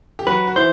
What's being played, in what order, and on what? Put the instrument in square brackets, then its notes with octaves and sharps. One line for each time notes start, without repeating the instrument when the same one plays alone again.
[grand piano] G4
[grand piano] F#3 F#4 [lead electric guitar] B4
[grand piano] F#4
[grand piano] E3 E4 [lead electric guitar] C5